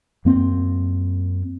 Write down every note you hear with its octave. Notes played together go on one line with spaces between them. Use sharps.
F#2 A#3 C4